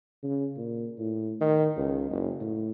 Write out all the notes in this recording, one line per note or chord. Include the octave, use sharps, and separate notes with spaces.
C#3
A#2
A2
D#3
C#2
F#1
A2